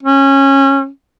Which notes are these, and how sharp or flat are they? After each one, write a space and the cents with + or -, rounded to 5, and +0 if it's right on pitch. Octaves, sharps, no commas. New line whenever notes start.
C#4 -20